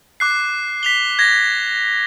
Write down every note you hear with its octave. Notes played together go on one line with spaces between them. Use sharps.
D6 F#6 C7
B6 F7 G7
G#6 A#6